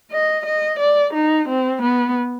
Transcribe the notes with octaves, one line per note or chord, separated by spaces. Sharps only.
D#5
D#5
D5
D#4
C4
B3